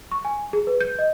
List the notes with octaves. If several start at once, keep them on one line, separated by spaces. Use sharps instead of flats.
C#6
G#5
G#4
B4
G6
D#5